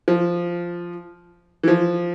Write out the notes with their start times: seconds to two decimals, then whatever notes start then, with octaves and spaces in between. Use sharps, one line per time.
0.08 F3
1.63 E3
1.68 F3